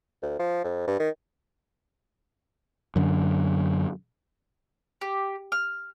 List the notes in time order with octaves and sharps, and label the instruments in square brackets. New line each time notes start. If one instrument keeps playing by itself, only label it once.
[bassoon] D2
F3
F2
G2
D#3
[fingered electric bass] F#2 D3
[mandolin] G4
F6